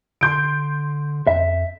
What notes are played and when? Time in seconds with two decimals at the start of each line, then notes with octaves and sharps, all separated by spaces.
0.21 D3 C6 G6 D7
1.27 F2 E5